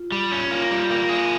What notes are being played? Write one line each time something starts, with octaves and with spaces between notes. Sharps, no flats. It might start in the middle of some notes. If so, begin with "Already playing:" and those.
Already playing: F4
G3
C#4
A#3 F4
G3 F4
A#3
G#4